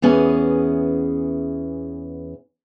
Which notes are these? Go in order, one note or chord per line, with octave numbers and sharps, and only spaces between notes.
E2 E3 B3 C#4 G#4 G#5